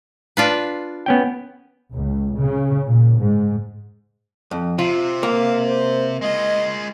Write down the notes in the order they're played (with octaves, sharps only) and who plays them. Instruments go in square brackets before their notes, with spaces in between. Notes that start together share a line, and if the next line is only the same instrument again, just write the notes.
[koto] D4 F4 B4
[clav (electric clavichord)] B3 C#4 G5
[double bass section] C#2
C#3
A#2
G#2
[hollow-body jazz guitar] F2
[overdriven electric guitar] C3 [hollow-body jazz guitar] F4
[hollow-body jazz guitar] A#3 [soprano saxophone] F5
[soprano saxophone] C5
[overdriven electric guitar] G#3 F4 [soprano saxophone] D#5